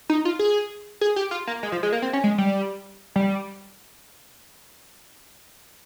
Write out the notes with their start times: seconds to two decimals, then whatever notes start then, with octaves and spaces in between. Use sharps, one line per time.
0.09 D#4
0.25 F4
0.39 G#4
1.01 G#4
1.16 G4
1.31 F4
1.47 A#3
1.63 G#3
1.72 F3
1.83 G#3
1.92 A#3
2.02 C4
2.13 C#4
2.24 G#3
2.38 G3
3.16 G3